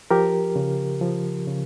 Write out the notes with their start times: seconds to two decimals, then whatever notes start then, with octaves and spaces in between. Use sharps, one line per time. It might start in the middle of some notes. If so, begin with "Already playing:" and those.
0.11 F3 G4 A#4
0.56 C#3
1.01 F3
1.47 C#3